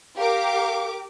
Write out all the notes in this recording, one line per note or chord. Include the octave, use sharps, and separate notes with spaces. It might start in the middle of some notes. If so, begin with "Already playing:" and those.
G4 A#4 F5 D6